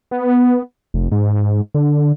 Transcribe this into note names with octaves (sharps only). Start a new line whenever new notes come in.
B3
F1
G#2
G#2
D3